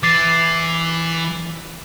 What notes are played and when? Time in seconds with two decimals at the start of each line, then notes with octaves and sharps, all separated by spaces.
0.03 E3 D6 A6 C7